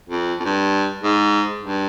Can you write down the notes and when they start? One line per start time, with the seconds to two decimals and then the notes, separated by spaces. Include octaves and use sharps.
0.09 F2
0.40 F2
0.45 G2
1.03 G#2
1.62 G2